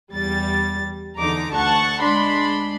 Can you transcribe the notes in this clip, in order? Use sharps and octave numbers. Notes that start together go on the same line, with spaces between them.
E2 G3 A6
E2 D3 D#4 A#5 D6
D2 F#5 A5 C#6
G#3 D4 B5 C6